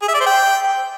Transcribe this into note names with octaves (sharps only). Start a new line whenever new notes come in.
G#4
E5
D5
C5
G5